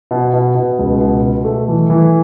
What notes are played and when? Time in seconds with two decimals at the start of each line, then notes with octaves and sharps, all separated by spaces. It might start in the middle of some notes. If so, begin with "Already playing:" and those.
0.11 B2
0.33 B2
0.55 B2
0.79 C#2
1.01 B2
1.22 B2
1.45 A3
1.68 E3
1.90 E3